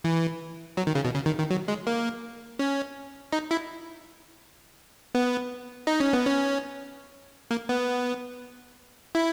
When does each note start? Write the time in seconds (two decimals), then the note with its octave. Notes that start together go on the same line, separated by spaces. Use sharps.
0.04 E3
0.77 F#3
0.87 D#3
0.95 C#3
1.05 B2
1.14 C#3
1.26 D#3
1.38 D#3
1.50 F#3
1.68 G#3
1.87 A#3
2.59 C#4
3.32 D#4
3.51 E4
5.15 B3
5.87 D#4
6.00 C#4
6.13 B3
6.26 C#4
7.51 A#3
7.69 B3
9.15 E4